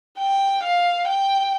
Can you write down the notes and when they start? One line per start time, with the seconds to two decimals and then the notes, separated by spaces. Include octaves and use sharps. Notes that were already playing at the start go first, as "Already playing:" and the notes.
0.18 G5
0.63 F5
1.07 G5